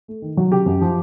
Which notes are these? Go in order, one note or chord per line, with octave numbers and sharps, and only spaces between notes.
A3
D#3
F#3
C#3 G4
F#2
F3